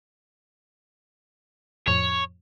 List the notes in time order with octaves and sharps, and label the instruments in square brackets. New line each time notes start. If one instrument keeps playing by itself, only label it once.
[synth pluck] F2 A2 F3 [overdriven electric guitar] C#5